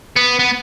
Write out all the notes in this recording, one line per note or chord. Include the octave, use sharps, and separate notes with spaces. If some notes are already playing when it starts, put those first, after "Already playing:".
B3
B3